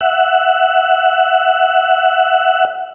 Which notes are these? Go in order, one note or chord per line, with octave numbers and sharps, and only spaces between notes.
E5 F#5